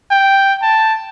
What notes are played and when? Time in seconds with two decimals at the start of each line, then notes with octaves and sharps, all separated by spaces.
0.11 G5
0.62 A5